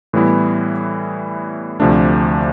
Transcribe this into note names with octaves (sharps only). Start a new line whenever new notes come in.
A2 E3 G3 B3 E4
D2 C3 F3 A3 D4